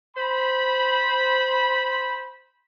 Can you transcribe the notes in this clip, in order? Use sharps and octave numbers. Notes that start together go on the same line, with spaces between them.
C5 B5